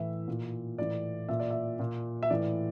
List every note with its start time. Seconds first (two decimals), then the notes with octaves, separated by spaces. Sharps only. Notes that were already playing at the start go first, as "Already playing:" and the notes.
Already playing: A2 E3 E5
0.28 A#2
0.78 A2 E3 D5
1.28 A#2 E5
1.40 D5
1.50 E5
1.79 A#2
2.23 E5
2.30 A2 E3 D5